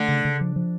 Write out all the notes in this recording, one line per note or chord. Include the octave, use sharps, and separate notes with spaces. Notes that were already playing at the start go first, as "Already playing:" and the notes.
Already playing: D3 A3
C#3
C#3
F3
F3